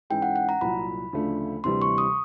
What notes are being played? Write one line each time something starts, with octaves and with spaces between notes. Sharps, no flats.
G#2 E3 G#3 C#4 E4 G5
F#5
F#5
A#5
C2 A#2 F#3 B5
D2 C#3 F3 A3 D4
D2 C3 E3 G3 C6
C#6
D#6